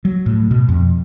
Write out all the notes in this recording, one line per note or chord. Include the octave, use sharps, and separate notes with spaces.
F#3
A2
B2
F2